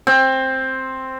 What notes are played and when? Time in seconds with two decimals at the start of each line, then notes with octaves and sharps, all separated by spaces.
0.07 C4